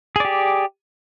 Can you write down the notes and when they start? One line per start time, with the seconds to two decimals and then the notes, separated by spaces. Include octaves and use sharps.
0.16 G#4
0.20 D5
0.25 G4